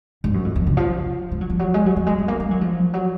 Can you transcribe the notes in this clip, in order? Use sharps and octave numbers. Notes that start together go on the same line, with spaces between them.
G#2
F#2
F2
F2
C#3
F3
G#3
F#3
F3
F#3
G#3
F#3
F#3
G#3
G#3
A#3
G#3
F#3
F3
F#3